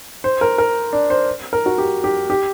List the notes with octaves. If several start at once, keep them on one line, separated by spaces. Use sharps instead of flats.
C5
A#4
A#4
D4
C5
A#4
F#4
G4
G4
G4